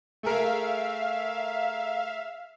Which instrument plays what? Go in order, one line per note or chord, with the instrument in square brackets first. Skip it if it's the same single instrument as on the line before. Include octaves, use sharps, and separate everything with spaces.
[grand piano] A3 G#4 A#4 [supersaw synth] E5 F5